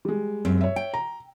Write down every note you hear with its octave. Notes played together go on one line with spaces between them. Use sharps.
G3 G#3
F#2 C4
C#5 E5
G5
A#5